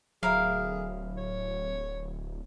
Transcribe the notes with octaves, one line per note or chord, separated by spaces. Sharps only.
D1 F#3 E4 G#4 A#4 F5
C#5